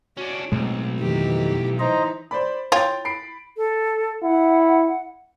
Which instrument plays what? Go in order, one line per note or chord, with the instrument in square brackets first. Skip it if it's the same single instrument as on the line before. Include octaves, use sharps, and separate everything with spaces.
[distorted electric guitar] C#4 D4 [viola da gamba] F#4
[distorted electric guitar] B1 [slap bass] A2 G#3 [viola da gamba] C4
[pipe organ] F2 D#3 [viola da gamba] E3 G4
[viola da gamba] E3 D#4 [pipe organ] C5 D#5 A#5
[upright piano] C5 D5 B5
[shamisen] F4 C#5 [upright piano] G5 A6
[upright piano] B5 C7 D7
[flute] A4
[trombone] E4 [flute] F#5